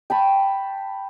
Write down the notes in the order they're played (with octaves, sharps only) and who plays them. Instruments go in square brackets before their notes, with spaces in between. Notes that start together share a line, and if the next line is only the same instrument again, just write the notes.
[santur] G5 A5 B5 C#6